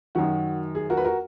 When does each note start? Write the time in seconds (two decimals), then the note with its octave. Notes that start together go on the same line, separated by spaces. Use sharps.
0.15 F#2 D#3 F#4
0.75 G#4
0.90 F#4 A#4
0.97 B4
1.05 F#4 A#4